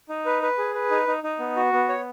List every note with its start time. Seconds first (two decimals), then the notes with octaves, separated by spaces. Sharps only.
0.09 D#4
0.26 B4
0.42 B4
0.58 G#4
0.75 B4
0.91 D#4
1.08 D#4
1.23 D#4
1.40 B3
1.56 F#4
1.73 B3
1.89 C#5